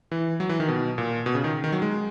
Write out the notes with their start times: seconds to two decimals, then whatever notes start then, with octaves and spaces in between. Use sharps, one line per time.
0.11 E3
0.40 F#3
0.49 E3
0.60 D#3
0.68 B2
0.98 A#2
1.26 B2
1.35 C#3
1.44 D#3
1.64 D#3
1.72 F#3
1.82 G#3